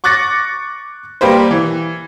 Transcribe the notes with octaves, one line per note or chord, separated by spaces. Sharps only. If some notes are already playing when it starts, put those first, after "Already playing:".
C#6 D6 F#6 A6 A#6 C#7
G3 A#3 G4 B4 C5
E3